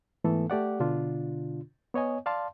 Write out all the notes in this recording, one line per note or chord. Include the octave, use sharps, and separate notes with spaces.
G#2 E3 A3 B3 A4
A3 G4 D5 F#5
B2 D3 D4 F4
B3 C#5 D#5 G#5
D5 F5 A5 C6